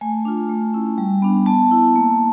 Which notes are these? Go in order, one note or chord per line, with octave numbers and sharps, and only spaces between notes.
A3 G#5
D4 F4
A3
C#4 E4
G3
B3 D4
B3 A5
E4
A#3